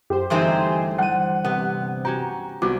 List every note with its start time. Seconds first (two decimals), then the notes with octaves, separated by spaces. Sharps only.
0.10 F#2 G4 C5
0.30 G1 E3 G#3 A3 C4 D#4 G#5 C6
0.98 G3 C5 F#5 D#7
1.45 C3 B3
2.05 C#4 F#4 G4 A#5
2.62 C2 B3 F#4 D6